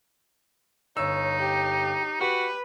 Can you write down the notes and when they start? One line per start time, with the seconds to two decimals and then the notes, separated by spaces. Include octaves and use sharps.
0.97 G1 D#4 C#5 E6
1.39 G4
2.21 F#4 G4 B4